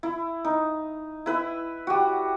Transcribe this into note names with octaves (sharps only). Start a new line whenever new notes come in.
E4
D#4
E4 B4 E5
G3 F#4